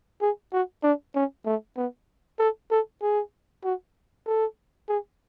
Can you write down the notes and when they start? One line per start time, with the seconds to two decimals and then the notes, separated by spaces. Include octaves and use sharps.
0.21 G#4
0.52 F#4
0.83 D4
1.15 C#4
1.46 A3
1.77 B3
2.39 A4
2.71 A4
3.02 G#4
3.64 F#4
4.27 A4
4.88 G#4